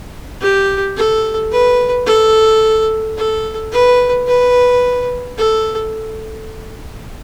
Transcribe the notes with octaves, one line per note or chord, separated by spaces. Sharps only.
G4
A4
B4
A4
A4
B4
B4
A4